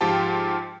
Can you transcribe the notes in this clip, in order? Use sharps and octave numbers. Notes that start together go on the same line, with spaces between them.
G#2 F3 F4 G4 G5 A5